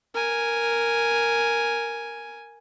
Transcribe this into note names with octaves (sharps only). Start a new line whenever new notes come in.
A#4 G#5